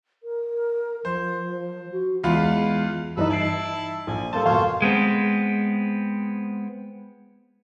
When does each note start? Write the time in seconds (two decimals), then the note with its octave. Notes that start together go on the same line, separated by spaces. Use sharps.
0.23 A#4
1.05 F3 C5
1.91 F#4
2.24 E2 G#3 F4 B5
3.17 G2 E3 D#4 A4 B4
3.30 E4 A5 C7 D7 F#7
4.07 A#1 G#5
4.33 G3 A#3 A4 C5 A5
4.45 F2 B2 C5 C#5 F5 A5
4.82 G#3 B3 C4